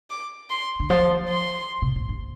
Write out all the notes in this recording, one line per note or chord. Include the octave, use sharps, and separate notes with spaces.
D6
C6
D3
F3 C6
C6
C3
A#2
G2